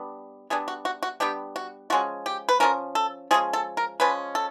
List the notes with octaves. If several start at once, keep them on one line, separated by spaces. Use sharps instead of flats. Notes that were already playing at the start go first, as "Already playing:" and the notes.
Already playing: G3 B3 D4
G3 B3 D4 G#4
F#4
F#4
F#4
G3 B3 D4 G4
F#4
F3 G#3 C#4 F#4
G4
B4
F3 G#3 C#4 A#4
A4
F3 G#3 C#4 G#4
A4
A#4
F3 G#3 C#4 B4
A4